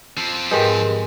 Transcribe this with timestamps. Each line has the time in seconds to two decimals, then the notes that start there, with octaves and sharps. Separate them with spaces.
0.17 F3 C4
0.51 G#2 G#3 G4 A#4 B4 G5 G6